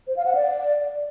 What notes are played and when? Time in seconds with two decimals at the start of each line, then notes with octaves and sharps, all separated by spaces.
0.07 C5
0.16 F5
0.26 F#5
0.35 D5